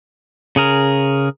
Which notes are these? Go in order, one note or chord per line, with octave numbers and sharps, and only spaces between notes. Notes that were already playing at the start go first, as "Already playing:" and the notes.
C#3 G#4 A#4